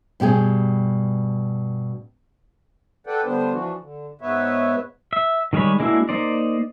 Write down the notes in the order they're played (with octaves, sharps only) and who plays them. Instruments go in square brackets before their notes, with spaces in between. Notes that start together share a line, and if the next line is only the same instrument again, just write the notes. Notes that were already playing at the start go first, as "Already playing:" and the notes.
[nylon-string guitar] G2 B2 G4 G#4
[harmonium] A4 B4 D5 F#5 G5
D3 G3 B3 D4 C5
E3 F3 D4 F#4
D3
G#2 B3 B4 C#5 E5
[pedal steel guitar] E5
D#3 G3 G#3 C#5 B5
G#3 A#3 D4 E4 F#4
A#3 D#4 C5 D5